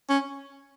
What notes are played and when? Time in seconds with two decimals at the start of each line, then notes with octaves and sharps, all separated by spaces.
0.09 C#4